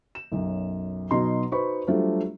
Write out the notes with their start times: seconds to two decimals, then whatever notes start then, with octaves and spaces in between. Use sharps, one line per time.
0.15 E7
0.32 B1 F#2
1.11 B2 F#3 D#4 A#5 C6
1.51 D#4 F#4 B4 C5 B5 C#6
1.87 F#3 G3 A3 D4 F4 C5